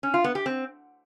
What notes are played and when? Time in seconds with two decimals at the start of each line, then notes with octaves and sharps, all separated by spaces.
0.03 C#4
0.14 F4
0.24 B3
0.35 G4
0.46 C4